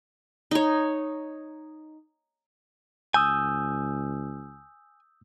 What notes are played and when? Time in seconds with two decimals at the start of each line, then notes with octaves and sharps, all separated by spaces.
0.51 D#4 C#5
3.14 C#2 G#5 D#6 E6 G6